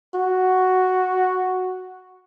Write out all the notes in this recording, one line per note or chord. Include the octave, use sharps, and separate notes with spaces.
F#4